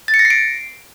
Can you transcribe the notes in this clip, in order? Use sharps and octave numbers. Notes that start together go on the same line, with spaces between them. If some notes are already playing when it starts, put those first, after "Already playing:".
A6
C#7
A#6
C7
D7